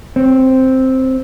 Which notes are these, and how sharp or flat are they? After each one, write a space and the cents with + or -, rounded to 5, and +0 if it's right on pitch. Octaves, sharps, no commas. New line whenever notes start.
C4 +0 C#5 -15